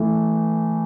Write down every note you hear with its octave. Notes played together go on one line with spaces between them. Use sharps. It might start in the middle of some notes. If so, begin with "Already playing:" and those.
Already playing: E3 A3